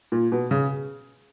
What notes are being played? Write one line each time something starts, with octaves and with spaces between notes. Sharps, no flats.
A#2
B2
C#3